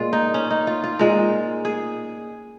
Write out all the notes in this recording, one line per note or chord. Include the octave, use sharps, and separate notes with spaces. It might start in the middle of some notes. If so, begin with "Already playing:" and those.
Already playing: A#2 G#3 F4
D#4
C#4
D#4
F4
F4
A#2 G#3 A#4
G#4